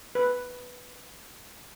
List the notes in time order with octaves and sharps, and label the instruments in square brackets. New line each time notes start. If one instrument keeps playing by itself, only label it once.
[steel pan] B4